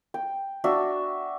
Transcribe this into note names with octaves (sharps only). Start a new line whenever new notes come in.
G5
D4 F#4 E5